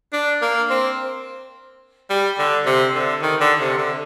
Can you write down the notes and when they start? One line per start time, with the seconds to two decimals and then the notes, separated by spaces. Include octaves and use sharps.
0.13 D4
0.42 A#3
0.70 C4
2.10 G3
2.38 D3
2.66 C3
2.95 D3
3.22 D#3
3.41 D3
3.60 C3
3.78 D3